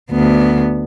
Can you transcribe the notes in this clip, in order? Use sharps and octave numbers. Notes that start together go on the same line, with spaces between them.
D2 B3